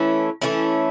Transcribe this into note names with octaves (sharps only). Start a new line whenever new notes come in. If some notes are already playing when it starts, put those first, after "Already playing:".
Already playing: E3 A3 C#4 E4
E3 A3 C#4 E4